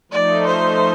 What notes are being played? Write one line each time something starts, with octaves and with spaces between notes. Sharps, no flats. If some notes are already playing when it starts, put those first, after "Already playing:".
F3 A3 D#4 D5
C5